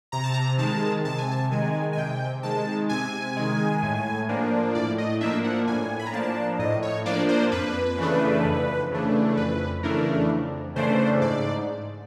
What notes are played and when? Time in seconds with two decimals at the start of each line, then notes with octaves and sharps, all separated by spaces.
0.12 C3 A#5
0.24 A5
0.34 A#5
0.58 D#3 G#3 A5
1.05 C3 A5
1.18 G#5
1.31 A5
1.51 D#3 G#3 G#5
1.93 G#5
1.97 C3 G5
2.43 D#3 G#3 A5
2.89 C3 G#5
3.36 D#3 G#3
3.83 A2
4.29 F3 A#3 D4
4.75 A2 D5
4.98 D#5
5.21 F3 A#3 D4 E5
5.44 F#5
5.67 A2 G#5
5.99 B5
6.06 A#5
6.13 F3 A#3 D4 A5
6.59 A2 D#5
6.83 C#5
7.06 F3 A#3 D4 D5
7.29 C5
7.52 F2 B4
7.98 C#3 E3 A3 D4
8.45 F2
8.91 C#3 E3 A3 D4
9.37 F2 B4
9.83 C#3 E3 A3 D4 A#4
10.30 F2
10.76 C#3 E3 A3 D4 C5
11.22 G#2 D5